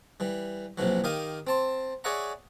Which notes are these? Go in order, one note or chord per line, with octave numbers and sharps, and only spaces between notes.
E3 G3
A#1 C3 E3 F#3
D#3 G4 A#4 D#5 F5 D#6
C4 A5 C6
G#4 C#5 D5 E5 F#5 A#5